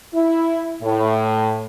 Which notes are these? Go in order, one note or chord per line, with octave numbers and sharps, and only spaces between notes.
E4
A2